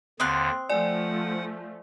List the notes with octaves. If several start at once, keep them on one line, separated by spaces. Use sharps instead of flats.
D#2 D3 C4 C6 D#6 F#6
F3 A3 D5 F#5 G#5